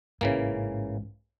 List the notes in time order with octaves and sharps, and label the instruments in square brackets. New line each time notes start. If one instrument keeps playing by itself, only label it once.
[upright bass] A1 G#2 [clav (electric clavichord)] C#3 E3 A#3